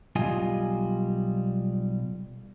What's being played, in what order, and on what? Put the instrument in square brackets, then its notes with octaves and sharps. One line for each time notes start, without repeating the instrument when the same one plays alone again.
[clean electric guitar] B1 G3 F4 D#5 G#5